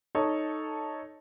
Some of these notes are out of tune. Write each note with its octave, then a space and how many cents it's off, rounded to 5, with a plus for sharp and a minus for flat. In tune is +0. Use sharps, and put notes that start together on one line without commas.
D#4 +0 A4 +0 C#5 +0